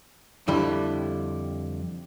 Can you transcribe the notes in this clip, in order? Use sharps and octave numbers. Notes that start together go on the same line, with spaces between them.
F2 D3 G3 E4